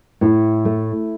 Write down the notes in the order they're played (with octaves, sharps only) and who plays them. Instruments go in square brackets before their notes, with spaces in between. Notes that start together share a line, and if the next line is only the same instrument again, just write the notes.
[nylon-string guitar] A2 [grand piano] E4
[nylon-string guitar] A3